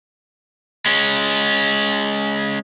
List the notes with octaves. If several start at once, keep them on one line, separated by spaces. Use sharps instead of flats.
G#3 C#4